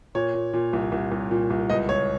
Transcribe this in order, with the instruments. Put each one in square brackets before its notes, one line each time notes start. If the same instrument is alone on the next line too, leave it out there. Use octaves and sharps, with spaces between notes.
[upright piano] A#2 C#5
A#2
A#2
C2
C2
C2
A#2
C2
C#2 D#5
C#2 C#5